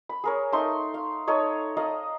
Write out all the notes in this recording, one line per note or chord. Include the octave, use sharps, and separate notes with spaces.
B5
G#4 A#4 C#5
A3 D#4 C6 C#6
F5
D#4 A4 C#5 D#5
D5 D#5 F5 A#5